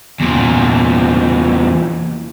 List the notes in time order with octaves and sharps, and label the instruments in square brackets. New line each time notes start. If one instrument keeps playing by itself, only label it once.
[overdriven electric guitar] E2 A#2